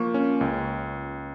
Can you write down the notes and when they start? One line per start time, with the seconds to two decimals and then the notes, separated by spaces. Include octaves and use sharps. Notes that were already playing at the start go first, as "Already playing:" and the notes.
Already playing: F3 A#3 C#6
0.14 C#4
0.41 C#2